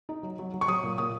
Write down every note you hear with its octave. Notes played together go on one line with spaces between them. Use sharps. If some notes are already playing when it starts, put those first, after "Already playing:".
D#4
F#3
F#3
F#3
C#6
F#3 D#6
A#2
A#2 D#6